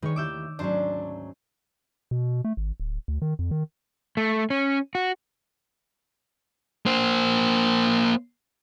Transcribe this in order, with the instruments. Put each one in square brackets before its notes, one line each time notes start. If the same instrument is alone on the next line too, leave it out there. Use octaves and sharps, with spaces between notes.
[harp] D#3 C#5 [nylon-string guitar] G#3 B4
[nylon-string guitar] D#2 E4 G4 [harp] D6 E6 G6
[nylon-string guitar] D2 G#2 F#3 [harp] C#4 C5 [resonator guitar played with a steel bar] D4
[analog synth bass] B2
A3
G#1
D1
D2
D#3
F2
D#3
[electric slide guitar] A3
C#4
F#4
[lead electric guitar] A#3 C5